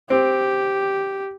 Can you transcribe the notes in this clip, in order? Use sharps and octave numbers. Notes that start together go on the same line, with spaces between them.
C4 G4